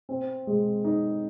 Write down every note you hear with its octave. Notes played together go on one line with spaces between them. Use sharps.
C4
G#3
D#4